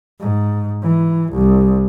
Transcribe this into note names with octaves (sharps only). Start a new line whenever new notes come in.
G#2
E3
C2